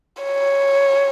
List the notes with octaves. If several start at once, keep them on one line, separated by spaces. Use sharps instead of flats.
C#5